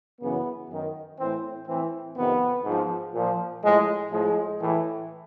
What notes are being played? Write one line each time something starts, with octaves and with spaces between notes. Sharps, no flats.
F#2 C#3 E3 B3
F#2 D#3
A2 E3 C4
A2 E3 C4
F2 C3 D#3 B3
G#2 F3
A#2 F3
A2 F3 G#3
A2 F3 G#3
A2 E3